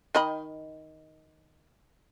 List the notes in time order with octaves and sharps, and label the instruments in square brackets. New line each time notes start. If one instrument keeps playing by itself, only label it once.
[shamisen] D#3 D#5 B5